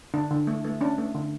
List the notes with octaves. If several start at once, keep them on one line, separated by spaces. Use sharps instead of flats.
D3 D4
D3
A3
A3
C#4 D4
A3
D3